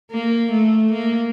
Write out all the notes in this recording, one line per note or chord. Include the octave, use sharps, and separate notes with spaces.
A#3
A3
A#3